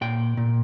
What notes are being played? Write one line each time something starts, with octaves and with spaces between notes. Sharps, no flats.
A#2 G5
A#2